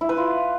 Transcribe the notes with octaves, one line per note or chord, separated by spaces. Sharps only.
E4
B4
F4